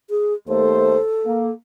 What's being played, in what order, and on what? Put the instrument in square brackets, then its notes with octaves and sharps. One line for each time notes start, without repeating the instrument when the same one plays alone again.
[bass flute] G#4
[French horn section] D#2 A3 C5 [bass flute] A4
[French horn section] A#3